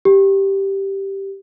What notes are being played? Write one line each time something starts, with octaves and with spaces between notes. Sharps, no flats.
G4